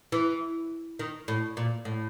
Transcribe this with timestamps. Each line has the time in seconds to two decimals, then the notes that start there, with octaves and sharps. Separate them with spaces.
0.12 E3
0.99 D#3
1.28 A2
1.57 A#2
1.85 A2